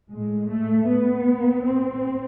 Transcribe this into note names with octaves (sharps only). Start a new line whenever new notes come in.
A2 G#3
A3
B3
A2 C4